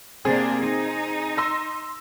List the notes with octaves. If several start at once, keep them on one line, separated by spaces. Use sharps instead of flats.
C3 A#3 C4 D4 G#4
D#4
C6 E6 A#6